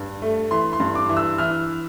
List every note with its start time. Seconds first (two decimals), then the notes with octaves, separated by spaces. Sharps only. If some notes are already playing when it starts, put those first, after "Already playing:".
Already playing: G2
0.22 A3
0.51 E3 C6
0.73 C6
0.80 G2
0.95 D6
1.09 E3
1.17 E6
1.38 E3 F6